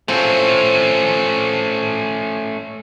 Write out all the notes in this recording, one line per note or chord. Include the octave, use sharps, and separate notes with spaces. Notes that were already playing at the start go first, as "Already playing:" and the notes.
A3 C4 C#4 F4 C5